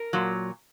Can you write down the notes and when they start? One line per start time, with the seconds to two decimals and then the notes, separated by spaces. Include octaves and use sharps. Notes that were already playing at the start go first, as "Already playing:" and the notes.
Already playing: A#4
0.13 A#2 F#3